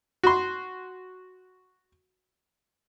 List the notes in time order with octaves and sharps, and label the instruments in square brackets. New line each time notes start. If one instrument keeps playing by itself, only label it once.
[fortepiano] F#4 C6